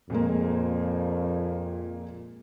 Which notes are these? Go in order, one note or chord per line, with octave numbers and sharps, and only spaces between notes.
F2 A#2 G#3 A#3